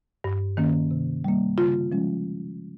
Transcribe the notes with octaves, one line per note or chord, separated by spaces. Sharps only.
G2
D#3 A#3 C#4
C3
G3 A#3
C#3 F4
F3 G#3 C#4